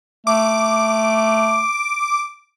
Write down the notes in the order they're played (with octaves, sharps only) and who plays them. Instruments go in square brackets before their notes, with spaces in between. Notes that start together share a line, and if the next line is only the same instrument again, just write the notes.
[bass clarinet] A3 [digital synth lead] D6